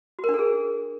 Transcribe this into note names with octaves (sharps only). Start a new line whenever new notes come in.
F#4
A#4
D4
A4
G#4